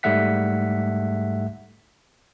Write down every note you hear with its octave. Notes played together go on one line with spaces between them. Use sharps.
G#2 G3 A3 E5 F#5 B6